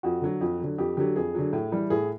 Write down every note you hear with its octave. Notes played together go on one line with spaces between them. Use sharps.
F2 F#4
D3 F#3
F2
D3 F#3
F2 G4
D3 F#3 G4
F2 G#4
D3 F#3
A2
E3 G3
A2 G#4